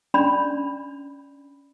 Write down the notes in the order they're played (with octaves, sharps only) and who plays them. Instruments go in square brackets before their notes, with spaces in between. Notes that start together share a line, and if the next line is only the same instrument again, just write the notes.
[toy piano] C#4 D4 D5 B5